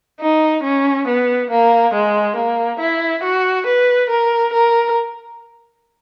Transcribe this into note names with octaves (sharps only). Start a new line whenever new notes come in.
D#4
C#4
B3
A#3
G#3
A#3
E4
F#4
B4
A#4
A#4